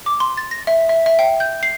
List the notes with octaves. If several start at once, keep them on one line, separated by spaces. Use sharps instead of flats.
D6
C6
A6
A#6
E5
E5
E5
G5
G6
C7